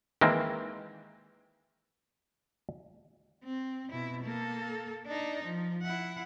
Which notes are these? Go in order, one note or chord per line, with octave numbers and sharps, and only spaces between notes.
D#3 E3 G#3 A#3 C4
C4
B2 E4
A#3 A4
D4 D#4
F3
E4 F#5